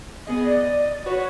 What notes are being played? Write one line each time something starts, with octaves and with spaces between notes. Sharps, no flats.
B3 G#4 D#5
D5 D#5
F#4 B4 C#5